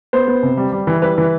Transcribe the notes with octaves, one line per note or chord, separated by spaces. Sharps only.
B3 C5
B3
C3
G3
G3
E3
G3 B4
E3